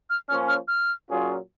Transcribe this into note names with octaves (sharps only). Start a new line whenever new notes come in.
F6
F3 A#3 C#4 F6
F6
F6
A#2 F#3 C#4 F4 G#4